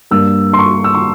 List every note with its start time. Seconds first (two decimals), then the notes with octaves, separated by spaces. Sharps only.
0.11 G2 G3 A#3 E6
0.53 C6
0.59 C#6
0.84 E6
0.95 C#6